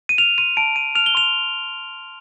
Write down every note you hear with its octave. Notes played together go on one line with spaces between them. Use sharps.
D#7
F6 F7
C6 D#7
A5 D7
A5 D#7
F6 F7
G7
C6 F7